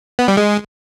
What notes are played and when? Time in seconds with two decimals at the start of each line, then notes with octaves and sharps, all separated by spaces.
0.19 B3
0.28 G3
0.37 G#3